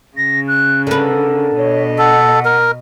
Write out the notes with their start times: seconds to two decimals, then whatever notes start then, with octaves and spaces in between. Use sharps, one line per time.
0.17 C#3 A#6
0.47 F#6
0.87 D3 A#4 B4
1.57 B2 C#5 D#5
1.98 A4 F#5
2.45 A#4